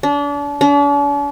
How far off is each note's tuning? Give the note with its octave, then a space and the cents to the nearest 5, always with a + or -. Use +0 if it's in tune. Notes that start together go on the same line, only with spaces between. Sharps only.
D4 -35
D4 -45